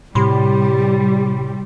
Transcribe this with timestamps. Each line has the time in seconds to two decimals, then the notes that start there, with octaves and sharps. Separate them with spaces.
0.15 A2 C3 G3 G4 B5 C6